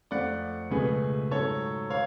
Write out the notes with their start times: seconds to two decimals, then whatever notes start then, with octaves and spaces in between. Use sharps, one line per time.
0.11 F2 F3 A3 D5 F#5
0.71 C#2 B2 A3 G#4 B4
1.31 G#2 F#3 A3 A4 C#5
1.90 C#5 F5